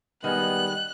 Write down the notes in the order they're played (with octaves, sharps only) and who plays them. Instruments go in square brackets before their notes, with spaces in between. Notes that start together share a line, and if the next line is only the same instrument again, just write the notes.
[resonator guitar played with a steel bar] D#3 G#3 [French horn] G3 [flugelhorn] B3 [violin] F#6